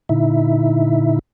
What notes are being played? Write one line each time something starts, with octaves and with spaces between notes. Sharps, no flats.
A#2 D3 D#4 E4 E5